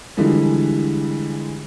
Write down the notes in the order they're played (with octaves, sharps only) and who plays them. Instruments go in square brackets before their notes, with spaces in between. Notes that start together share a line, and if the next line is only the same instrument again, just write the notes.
[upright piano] D3 E3 F3 G3 G#3